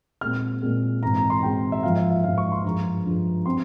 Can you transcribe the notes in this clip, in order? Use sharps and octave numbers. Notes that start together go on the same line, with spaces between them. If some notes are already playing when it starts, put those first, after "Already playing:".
A#2 G#3 C4 F6
A#2 G#3 C4
G#2 E3 G#3 C4 A#5
A#5
C6
G#2 E3 G#3 C4 G5
E5
G#2 F3 A#3 F5
E5
F5
G#2 F3 A#3 F5
C#6
C6
G2 F3 G#3 A#5
G2 F3 G#3
G3 C4 C6